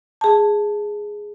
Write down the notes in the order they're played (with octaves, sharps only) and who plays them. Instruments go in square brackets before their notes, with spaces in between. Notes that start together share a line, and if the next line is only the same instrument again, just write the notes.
[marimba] G#4 A5